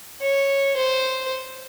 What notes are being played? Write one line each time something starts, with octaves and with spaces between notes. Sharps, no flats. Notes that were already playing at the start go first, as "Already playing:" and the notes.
C#5
C5